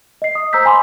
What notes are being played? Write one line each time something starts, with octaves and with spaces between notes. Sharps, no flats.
D#5 C7
D#6
C5 A#5 E6 G6 B6
G#5 B5 C6 D6